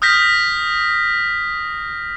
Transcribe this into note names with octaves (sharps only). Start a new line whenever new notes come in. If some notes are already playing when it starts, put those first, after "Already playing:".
D#6 F6 G6 A#6 B6